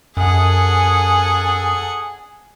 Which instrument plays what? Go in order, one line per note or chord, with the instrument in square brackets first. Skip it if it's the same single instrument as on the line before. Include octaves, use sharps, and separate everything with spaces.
[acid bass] F#2 [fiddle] G#4 F#5 [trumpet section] A4 D#6 [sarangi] G#5